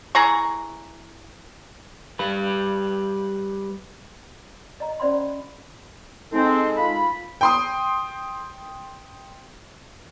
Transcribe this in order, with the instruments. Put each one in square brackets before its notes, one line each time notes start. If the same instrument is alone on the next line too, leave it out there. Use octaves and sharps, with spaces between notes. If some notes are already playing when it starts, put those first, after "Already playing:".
[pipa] E3 G#4 A#5 C#6
[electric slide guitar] G3 B4
[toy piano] D#5 A#5
C#4 C5 D5 F#5 B5 C6
[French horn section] G#3 D#4 A4 [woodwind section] C4
[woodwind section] F4 B5
[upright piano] G5 C6 D#6